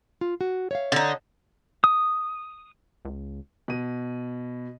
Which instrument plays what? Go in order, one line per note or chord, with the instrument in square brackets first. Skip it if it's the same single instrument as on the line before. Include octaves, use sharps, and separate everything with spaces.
[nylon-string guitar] F4
F#4
C#5 E5 F5
[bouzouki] D3 D#4
[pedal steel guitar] D#6
[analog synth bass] C#2
[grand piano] B2 D#7